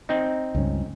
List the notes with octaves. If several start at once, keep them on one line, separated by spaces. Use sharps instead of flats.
C4 D#4
C#2 G2 C#4